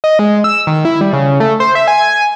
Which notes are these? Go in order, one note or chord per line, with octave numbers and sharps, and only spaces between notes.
D#5
G#3
E6
D#3
E4
G3
C#3
A3
C5
E5
G#5